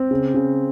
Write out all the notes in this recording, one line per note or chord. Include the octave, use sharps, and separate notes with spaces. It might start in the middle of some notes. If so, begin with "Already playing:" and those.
Already playing: C4
C#3
C#3